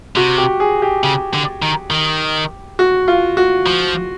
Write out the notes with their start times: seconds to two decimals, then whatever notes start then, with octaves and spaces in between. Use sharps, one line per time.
0.16 C3 F#4
0.38 G4
0.60 G#4
0.82 G4
1.04 C#3
1.33 D3
1.62 D#3
1.91 D#3
2.79 F#4
3.08 F4
3.37 F#4
3.66 F3